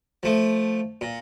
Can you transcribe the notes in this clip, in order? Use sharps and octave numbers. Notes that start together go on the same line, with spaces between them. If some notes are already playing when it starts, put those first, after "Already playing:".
F3 A3
A#2